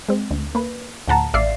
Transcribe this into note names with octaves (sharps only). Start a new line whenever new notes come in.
G#3 C4
D2
A#3 B4
D2 A2 F#5 A5 A#5
A1 D5 E5 F5 C7